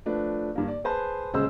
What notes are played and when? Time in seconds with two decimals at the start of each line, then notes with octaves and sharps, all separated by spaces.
0.06 F3 A3 D4 B4
0.55 G2 A#3
0.68 D5
0.84 G#4 B4 C5 A5
1.33 D#1 C#3 G#3 C5 E6